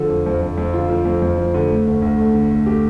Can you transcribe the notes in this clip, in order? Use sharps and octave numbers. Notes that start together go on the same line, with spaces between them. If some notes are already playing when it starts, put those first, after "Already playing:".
Already playing: D3 F3 A4
F2
F2
F2
F2
D3 F4
F3
F2
F2
F3
D3
A3
D2
D2
A3
D3
A3
A3 G4